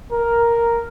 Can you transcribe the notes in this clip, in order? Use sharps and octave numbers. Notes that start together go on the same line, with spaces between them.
A#4